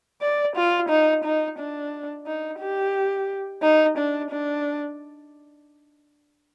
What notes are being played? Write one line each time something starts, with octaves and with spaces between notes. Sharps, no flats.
D5
F4
D#4
D#4
D4
D#4
G4
D#4
D4
D4